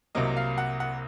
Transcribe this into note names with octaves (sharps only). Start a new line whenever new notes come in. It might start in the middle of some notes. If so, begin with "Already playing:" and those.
C2 C3 F#3 A#3 D#5
F5
F#5
F#5